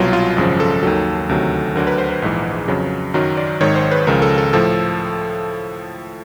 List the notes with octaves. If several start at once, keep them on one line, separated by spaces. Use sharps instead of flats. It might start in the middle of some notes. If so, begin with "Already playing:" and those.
Already playing: C2 B2 F#3 F4
F4
G#1 F#2 C#3 F3
A4
D#2 D#3 F#3 A4
D2 C3 D#3 F#3
D2 D3 F#3 A#4
B4
C5
B4
A#1 G#2 E3
F2 C#3 F#3
F#2 D#3 F#3 A#4
D5
G#1 G#2 D#3 C#5
C5
B4
C#2 C#3 F3 A#4
A4
A4
A2 F3 A4